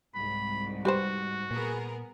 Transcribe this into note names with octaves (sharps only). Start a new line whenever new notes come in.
C2 G#2 B5
G3 F#4 G4 B4 C5
A#2 B3 G#4 A#4